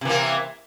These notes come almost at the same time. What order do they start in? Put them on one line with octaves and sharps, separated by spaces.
C3 E3 A#3